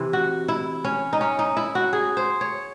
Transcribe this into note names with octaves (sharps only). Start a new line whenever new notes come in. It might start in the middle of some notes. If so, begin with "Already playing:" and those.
Already playing: C3 E3 E4
F#4
E4
C#4
D#4
C#4
D#4
E4
F#4
G#4
C5
C#5